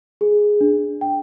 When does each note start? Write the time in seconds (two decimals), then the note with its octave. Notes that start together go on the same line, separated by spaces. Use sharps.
0.21 G#4
0.61 D4
1.01 G5